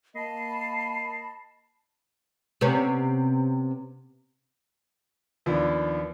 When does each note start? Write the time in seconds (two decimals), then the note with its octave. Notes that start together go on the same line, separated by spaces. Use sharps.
0.15 A#3 D#5 A5 B5 C7
2.61 C3 B3 C#4
5.46 D#2 F3 B3 D4